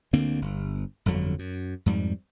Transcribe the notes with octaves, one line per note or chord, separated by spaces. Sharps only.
D2 D3 A#3 C4
G1
G1 F2 D3 F#3
F#2
F2 G#2 G3